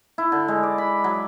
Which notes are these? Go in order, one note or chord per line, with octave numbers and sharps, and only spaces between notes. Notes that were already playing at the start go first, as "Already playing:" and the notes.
E4
D3
G#3
D5
B5
F#3